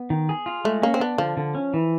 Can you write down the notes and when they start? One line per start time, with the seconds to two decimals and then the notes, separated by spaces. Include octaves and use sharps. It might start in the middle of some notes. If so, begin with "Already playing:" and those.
Already playing: B3
0.10 D#3
0.29 G#4
0.46 F4
0.65 G#3 A3
0.82 A#3 C#4
0.94 C4
1.00 B3 D4
1.18 D3 F3
1.37 D3
1.55 C#4
1.74 E3